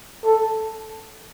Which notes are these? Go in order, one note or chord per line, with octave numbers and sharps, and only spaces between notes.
A4